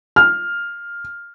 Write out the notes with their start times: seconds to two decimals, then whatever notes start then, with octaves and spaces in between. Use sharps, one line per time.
0.16 F6